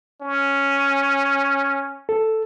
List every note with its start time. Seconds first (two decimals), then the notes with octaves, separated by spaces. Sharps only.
0.21 C#4
2.09 A4